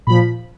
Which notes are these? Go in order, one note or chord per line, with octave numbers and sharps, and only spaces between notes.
A#2 F3 B5